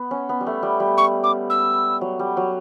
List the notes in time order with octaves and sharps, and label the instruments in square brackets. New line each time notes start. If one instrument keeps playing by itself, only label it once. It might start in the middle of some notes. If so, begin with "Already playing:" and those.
Already playing: [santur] B3
C#4
B3
G3
A3
G3
G3
[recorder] C#6
D6
E6
[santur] F#3
G3
F#3